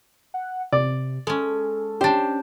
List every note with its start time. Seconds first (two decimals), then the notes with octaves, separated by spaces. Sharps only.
0.34 F#5
0.73 C3 D5
1.27 G#3 C#4 A4
2.01 C#4 D4 G4 C5